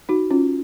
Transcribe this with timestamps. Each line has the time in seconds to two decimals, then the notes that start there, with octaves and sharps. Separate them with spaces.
0.09 D#4 F#4
0.31 C#4 F4